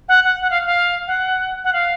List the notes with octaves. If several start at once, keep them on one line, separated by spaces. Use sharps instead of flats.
F#5
F#5
F#5
F5
F5
F#5
F#5
F5